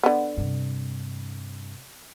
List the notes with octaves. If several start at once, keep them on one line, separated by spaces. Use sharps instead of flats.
D3 B3
G2 C3